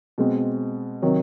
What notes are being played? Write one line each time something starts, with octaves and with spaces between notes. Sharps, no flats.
B2 G#3 C4
C3 D#3 F#3